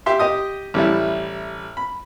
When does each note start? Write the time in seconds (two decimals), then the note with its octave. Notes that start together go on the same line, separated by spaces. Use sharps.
0.06 G4 E5 C6
0.19 G4 D#5 D#6
0.74 A1 G3 E4
1.77 B5